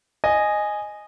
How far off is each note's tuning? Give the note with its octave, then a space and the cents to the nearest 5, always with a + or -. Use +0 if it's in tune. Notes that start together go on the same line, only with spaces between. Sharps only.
D#5 -10 G#5 +0